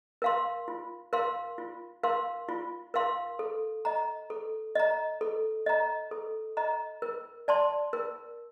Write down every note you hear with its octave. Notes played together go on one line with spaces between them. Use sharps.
A#4 F5 C6
F4
A#4 F5 C6
F4
A#4 F5 C6
F4
A#4 F5 C6
A4
D#5 A#5
A4
D#5 A#5
A4
D#5 A#5
A4
D#5 A#5
A#4
D5 A5 C6
A#4